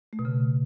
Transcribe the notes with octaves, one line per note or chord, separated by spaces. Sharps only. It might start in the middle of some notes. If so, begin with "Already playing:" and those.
A3
B2
C#3